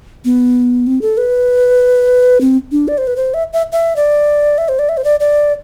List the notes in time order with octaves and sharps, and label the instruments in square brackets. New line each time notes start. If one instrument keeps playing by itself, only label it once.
[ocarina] B3
C4
A4
B4
C4
D4
D5
C5
B4
C5
E5
E5
E5
D5
E5
C5
D5
E5
C5
D5
D5